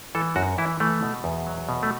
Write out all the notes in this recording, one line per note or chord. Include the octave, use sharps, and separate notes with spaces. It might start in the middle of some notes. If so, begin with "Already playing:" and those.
E3 A4
F#2 F#4
E3 E4
E3 A3
B2
E2
F#3
B2
A3